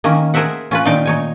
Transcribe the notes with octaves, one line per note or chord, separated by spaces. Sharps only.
D#3 A#3 C#4
G#4 A#4 C5 E5 F#5
C#4 F4 B4
A#2 D#3 D#4 F5 G5
D#4 C#5 G#5